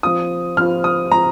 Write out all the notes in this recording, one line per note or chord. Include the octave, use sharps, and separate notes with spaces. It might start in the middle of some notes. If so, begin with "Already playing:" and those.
F3 C4 F4 D#6
F3 C4 F4 F6
D#6
F3 C4 F4 A#5